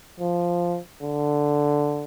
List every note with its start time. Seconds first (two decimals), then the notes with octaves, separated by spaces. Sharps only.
0.20 F3
1.03 D3